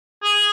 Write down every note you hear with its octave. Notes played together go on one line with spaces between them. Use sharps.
G#4